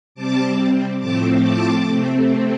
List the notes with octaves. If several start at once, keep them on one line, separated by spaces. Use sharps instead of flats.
C3 G3 C4 A5 D6
A2 F3 A3 C4 A5 D6
A5 D6
C3 A3 C4